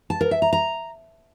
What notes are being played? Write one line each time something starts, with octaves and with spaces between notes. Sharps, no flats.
A5
A#4
E5
A#5
A#5